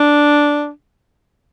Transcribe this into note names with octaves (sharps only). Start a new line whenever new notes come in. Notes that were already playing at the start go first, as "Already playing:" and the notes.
Already playing: D4